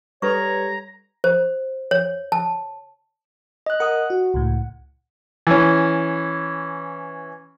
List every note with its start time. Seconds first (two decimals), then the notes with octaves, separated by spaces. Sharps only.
0.22 G3 A4 B4 C#5 A#5 C#6
1.24 C5
1.91 C#5
2.32 A5
3.66 D#5 F#6
3.80 A#4 F#5 D#6
4.10 F#4
4.34 C#2 A2
5.47 E3 C#4